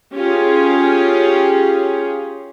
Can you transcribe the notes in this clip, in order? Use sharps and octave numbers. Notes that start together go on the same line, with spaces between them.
C#4 F4 G4 G#4